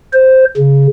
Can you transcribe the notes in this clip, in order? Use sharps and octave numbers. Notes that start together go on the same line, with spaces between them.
C5
C#3